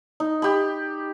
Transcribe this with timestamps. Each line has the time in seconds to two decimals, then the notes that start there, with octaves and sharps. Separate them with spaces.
0.20 D#4
0.42 G4 B5